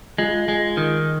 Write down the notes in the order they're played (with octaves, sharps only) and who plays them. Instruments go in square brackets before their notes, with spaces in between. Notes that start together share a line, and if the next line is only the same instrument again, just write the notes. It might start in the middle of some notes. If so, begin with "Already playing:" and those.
[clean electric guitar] G#3 [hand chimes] F4
[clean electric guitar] G#3
D#3